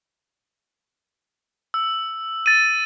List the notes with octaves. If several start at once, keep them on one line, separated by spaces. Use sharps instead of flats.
E6
A6 D#7